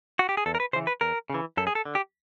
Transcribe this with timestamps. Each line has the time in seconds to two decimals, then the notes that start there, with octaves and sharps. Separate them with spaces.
0.19 F#4
0.29 G4
0.37 G#4
0.46 E2 A4
0.55 A#4
0.60 B4
0.73 C#3 C5
0.76 E3
0.87 B4
1.01 E2 A#4
1.30 C#3 E3
1.57 F#2 A4
1.67 G#4
1.75 A4
1.85 D3
1.95 G4